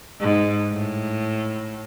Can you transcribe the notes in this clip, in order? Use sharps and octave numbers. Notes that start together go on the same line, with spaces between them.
G#2
A2